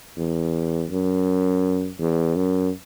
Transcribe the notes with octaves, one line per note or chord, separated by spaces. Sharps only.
E2
F#2
E2
F#2